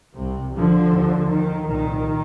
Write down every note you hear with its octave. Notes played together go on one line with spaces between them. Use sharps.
C2 C3
D3 F3
D#2
D#3
C2 A#2 D#3